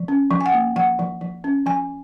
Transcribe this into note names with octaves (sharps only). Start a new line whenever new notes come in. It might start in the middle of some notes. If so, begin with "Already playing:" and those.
Already playing: F3
C#4
F3
G#5
F#5
A#3
F3 F#5
F3
F3
C#4
F3 G#5